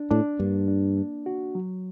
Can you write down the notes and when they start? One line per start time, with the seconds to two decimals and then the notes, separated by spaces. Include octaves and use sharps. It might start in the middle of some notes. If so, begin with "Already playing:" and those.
Already playing: D4
0.10 A2 D4
0.39 G2 A#3
0.68 D4
0.97 D4
1.26 F#4
1.55 F#3